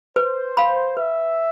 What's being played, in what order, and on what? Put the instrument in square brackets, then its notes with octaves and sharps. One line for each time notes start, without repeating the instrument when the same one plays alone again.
[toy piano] B4 [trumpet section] C5
[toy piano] F5 B5
[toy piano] B4 [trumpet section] E5